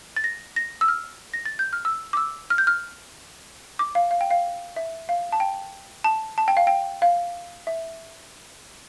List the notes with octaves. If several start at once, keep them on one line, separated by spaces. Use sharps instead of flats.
A6
A#6
A#6
E6
F6
A#6
A6
G6
F6
E6
D6
E6
F6
G6
F6
D6
F5
F5
G5
F5
E5
F5
A5
G5
A5
A5
G5
F5
G5
F5
E5